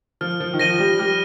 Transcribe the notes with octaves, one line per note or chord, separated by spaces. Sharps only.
F3 F6
F3
D#3
F3 A#6 D#7 G7
G3
G3 F6